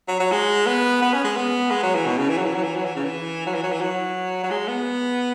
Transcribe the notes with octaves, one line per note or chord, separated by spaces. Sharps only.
F#3
F#3
G#3
B3
B3
C#4
G#3
B3
G#3
F#3
E3
B2
C#3
E3
F#3
E3
F#3
E3
F#3
E3
C#3
E3
F#3
E3
F#3
E3
F#3
F#3
G#3
B3